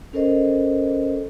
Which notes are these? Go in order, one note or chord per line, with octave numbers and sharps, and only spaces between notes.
C#4 A4 A#4 C5 D#5